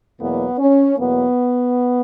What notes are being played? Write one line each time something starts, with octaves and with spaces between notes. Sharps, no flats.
E2 B2 F#3 A#3 B3
C#4
E2 B2 F#3 A#3 B3